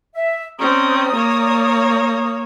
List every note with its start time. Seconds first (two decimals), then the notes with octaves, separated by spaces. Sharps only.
0.15 E5
0.59 C4 C#4 D5 A#5 D#6
1.15 A#3 C#5